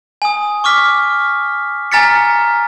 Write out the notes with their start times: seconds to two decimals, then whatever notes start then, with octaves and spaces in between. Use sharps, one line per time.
0.22 G#5 D#6
0.64 C#6 D6 F6 B6
1.92 G#5 A#5 F6 A6 B6 C#7